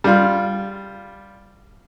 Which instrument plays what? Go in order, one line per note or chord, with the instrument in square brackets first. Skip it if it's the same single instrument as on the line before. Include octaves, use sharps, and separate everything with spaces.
[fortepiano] G3 F4